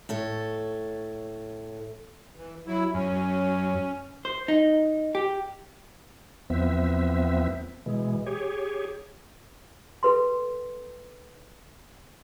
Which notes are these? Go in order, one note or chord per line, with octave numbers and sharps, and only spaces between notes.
A2 A4 C#5
E3
F#3 E4
F#2 C#4
C5
D#4
G4
E2 F3 B3 C4 E5
B2 E3 G#3
G4 G#4 C#5
A4 B4 C6